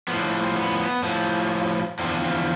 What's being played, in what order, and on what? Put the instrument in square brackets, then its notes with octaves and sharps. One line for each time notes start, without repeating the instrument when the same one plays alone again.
[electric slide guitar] A2 F3 B3
D4
D4
C4
B3
A2 F3
E2 D3 F3 C4
D4
C4
A3